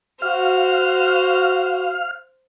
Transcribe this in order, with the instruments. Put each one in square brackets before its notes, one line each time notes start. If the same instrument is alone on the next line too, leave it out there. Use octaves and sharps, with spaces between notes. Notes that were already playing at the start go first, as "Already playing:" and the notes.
[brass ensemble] F#4 [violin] C5 F6 [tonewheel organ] F5